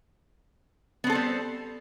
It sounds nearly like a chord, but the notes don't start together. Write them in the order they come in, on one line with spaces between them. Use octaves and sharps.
B3 C4 A4 C5 G3